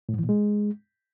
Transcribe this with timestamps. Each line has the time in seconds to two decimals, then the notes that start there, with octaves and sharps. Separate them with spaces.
0.09 A2
0.14 G#2
0.19 E3
0.24 A#2
0.29 G#3